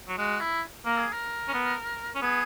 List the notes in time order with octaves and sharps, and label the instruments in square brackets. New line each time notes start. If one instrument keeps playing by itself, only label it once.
[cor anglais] F#3
[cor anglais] G#3 [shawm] F#4
[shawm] E4
[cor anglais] A#3 [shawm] A#4
[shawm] G#4
A#4
[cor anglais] C#4
B3
C#4
[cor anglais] B3 [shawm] G#4